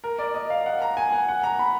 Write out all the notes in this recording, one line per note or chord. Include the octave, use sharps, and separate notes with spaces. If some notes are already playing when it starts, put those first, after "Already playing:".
A#4
D5
D#5
F5
F#5
A#5
G#5
F#5
F#5
A#5
B5